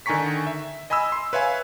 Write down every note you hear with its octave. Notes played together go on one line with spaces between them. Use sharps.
D3 D#3 G#5 A#5 C#6 B6
E5
D#5 G#5 B5 D#6 E6
C6
B4 C#5 E5 F5 G#5